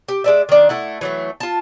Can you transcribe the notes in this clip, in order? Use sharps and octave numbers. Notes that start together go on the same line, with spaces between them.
G4
G#3 D5 E5
D#3 D4
A3 E4 F#5
E3 F#3 A3
F4 A5